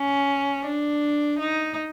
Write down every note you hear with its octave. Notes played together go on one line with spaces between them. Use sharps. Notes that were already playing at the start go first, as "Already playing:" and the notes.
Already playing: C#4
D4
D#4